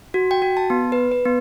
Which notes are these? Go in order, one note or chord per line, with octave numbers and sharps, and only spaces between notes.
F#4
G5
F#4
A5
B3
B4
B4
B3